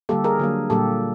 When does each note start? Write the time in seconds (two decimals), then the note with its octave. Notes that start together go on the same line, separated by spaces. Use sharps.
0.09 D3 G3 A#3 G4 A4
0.24 G#4 A#4
0.39 D3 F#3 A#3
0.70 A#2 G3 A#3 G4 A4